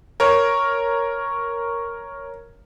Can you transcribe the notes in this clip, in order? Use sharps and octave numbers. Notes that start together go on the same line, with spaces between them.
A#4 C#5